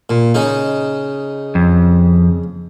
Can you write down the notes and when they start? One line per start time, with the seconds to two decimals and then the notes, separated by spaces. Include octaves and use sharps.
0.10 A#2
0.34 C#3 D#4
1.55 F2